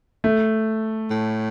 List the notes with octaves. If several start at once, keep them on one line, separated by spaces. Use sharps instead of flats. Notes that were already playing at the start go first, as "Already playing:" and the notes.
A3
A2